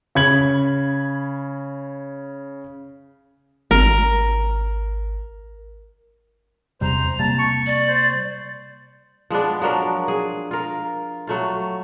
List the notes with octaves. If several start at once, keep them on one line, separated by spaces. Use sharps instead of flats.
C#3 B5 G#6 F#7
G#1 A#4
E2 C3 G3 C5 A#5
C3 G3 A#3 A5
C#6
D5
C5
F3 G#3 B3 D4
F3 F#3 D4 A#4
G#4
F4 A#4
F#3 A3 F4